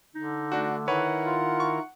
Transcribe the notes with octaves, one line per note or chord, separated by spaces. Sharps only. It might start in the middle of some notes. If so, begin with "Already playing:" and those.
D3 D#4
A3 D4 F#4
D#3 E4 A#4 B4 C#5 F#5
F4
C#6